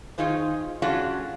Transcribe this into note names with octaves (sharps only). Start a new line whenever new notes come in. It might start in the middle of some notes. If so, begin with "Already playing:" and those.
D#3 D#4 F4 G#4 C5
G#3 C#4 D4 F4 F#4 A4